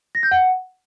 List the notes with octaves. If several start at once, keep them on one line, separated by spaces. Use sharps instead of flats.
A#6
G6
F#5